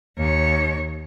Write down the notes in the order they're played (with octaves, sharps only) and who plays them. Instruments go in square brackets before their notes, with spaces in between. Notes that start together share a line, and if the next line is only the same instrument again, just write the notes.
[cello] D#2 C#5